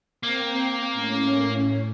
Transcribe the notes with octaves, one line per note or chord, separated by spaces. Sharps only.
A#3 C4 G5
A2 C#4